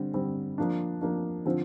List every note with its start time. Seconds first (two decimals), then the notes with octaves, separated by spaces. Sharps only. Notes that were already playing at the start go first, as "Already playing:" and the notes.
Already playing: D3 G3 C4
0.14 D3 G3 C4
0.58 F3 A#3 D4
1.02 F3 A#3 D4
1.45 D3 F3 C4 F4